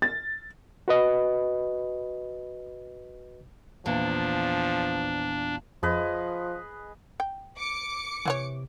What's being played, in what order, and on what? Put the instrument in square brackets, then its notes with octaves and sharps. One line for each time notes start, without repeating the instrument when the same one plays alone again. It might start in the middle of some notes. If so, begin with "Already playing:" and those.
[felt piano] A6
[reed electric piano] F#4 B4 D#5
[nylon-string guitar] E2 A#2 [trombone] F3 [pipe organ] D4
[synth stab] F2 [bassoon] F3 [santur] G#4 B4 D#5
[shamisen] G5
[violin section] D6 C#7
[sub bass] C3 [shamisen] E3 F#4 C#5